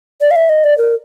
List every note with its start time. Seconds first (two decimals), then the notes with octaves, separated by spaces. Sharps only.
0.21 D5
0.31 F5
0.36 E5
0.49 D#5
0.64 D5
0.78 A#4